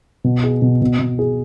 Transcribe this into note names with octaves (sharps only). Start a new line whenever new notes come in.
B2
G#4
B2
B2
B2
G#4